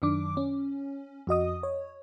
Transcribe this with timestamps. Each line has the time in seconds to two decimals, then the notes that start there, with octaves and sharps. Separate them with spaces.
0.02 F#2 D#3 D4 D6
0.37 C#4
1.27 F2 F#4 D#5 D#6
1.63 C#5